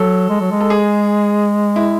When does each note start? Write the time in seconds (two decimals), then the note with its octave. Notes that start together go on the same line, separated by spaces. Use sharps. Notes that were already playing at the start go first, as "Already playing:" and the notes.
Already playing: F#3 A4
0.29 G#3
0.40 F#3
0.51 G#3
0.60 A4
0.70 G#4
1.76 E4